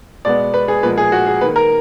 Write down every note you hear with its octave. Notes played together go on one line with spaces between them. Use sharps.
B2 G#3 B3 D5
B4
G#4
A#2 F3 G#3 B3 B4
G#4
F#4
G#4
D#3 A#3 B4
A#4